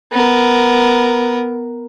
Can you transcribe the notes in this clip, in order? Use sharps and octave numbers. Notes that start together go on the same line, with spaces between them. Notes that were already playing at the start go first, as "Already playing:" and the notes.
B3 A#4